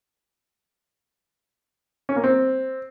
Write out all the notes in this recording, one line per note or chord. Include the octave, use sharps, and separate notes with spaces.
C#4
A#3
C4